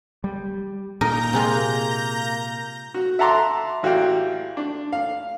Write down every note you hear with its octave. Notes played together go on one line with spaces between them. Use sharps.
G3
A#2 D#4 A#4 A#5 G6 A#6
C3 G#3 A#3 F4
F#4
E5 F#5 A5 A#5 C6 D6
A1 F#4 G4 F5 G5
D4
F5